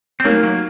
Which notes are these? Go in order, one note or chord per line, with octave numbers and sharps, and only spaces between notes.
C4
F#3 A3 A#3 D#4 A#4 C#5
F#3 A#3